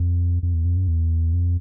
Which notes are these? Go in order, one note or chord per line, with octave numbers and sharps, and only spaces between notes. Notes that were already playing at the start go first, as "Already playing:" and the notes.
Already playing: F2
F2
E2
F2
F#2
E2
F2